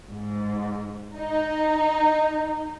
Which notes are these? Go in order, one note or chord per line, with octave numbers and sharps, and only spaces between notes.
G#2
D#4